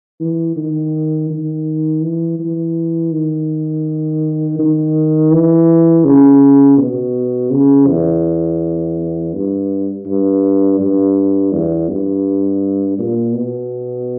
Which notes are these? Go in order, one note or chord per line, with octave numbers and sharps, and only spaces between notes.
E3
D#3
D#3
E3
E3
D#3
D#3
E3
C#3
B2
C#3
E2
G2
G2
G2
E2
G2
A#2
B2